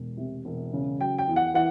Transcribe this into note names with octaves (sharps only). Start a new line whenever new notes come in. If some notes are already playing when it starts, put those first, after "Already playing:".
Already playing: E1
C3
E1
C#3
F#3 G5
G5
E2
F#5
E3 F#5